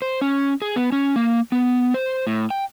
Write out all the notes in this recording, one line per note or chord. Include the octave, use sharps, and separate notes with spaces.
C5
C#4
G#4
B3
C#4
A#3
B3
C5
A2
G5